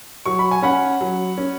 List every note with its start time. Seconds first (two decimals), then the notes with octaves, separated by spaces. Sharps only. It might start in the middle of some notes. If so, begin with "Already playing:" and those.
0.26 F#3 C#6
0.39 B5
0.51 G#5
0.62 C#4 F#5 B5
1.01 F#3
1.38 C#4